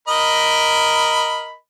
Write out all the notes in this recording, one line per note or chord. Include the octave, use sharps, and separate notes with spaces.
A#4 D#5 B5